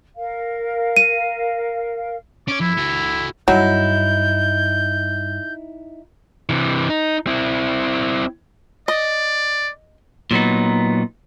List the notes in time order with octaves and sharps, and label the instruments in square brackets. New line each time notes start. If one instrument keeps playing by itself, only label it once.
[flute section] A#4 F5
[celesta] D#7
[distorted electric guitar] C#4 C#5 [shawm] D6
[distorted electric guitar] F2 [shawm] E4
[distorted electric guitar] F#4 A4
[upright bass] G2 [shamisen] F#3 [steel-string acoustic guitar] D#4 E4 [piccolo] G6
[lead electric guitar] C3 E3
D#4
C4 E4
[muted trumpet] D5 [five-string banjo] D#5
[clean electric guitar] A#2 F#3 B3 D#4